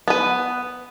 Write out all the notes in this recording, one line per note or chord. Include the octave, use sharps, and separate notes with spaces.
B3 B4